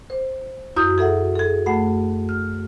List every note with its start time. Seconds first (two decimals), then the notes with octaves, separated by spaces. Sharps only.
0.10 C5
0.76 F#2 E4 F#4 D#6 G6
0.98 G#4 A4 E5 F#5
1.36 G#4 A4
1.66 F#2 A3 F#5 B5
2.29 F6